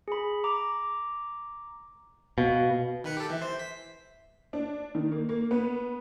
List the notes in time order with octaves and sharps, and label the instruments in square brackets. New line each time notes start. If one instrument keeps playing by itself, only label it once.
[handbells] G#4 B5
A#5 D6
[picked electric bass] B2 [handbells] F5
[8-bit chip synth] D#3 B4 C#7
G4 A4
[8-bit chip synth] E3 [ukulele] A4 B4 E5
[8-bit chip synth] C5
B6
[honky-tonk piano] D4
D#3
A#3
A#3
B3